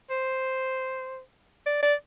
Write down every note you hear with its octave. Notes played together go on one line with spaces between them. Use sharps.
C5
D5
D5